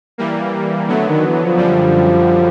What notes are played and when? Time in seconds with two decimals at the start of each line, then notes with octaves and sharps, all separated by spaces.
0.18 E3 G3 A#3
0.88 D3 F#3 A3 B3
1.05 D#3
1.23 E3
1.40 F3
1.57 F#2 D3 G3